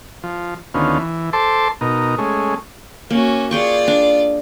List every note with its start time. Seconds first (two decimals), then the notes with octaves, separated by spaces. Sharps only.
0.23 F3
0.74 D2 D#3 B3 C#4 F4
0.98 E3
1.33 A4 C5 A5 C6 D6
1.81 B2 D#4 A#4
2.18 G#3 A3 C#4
3.10 A#3 C#4 F#4
3.51 F4 G#4 D5 G5 C#6
3.88 D4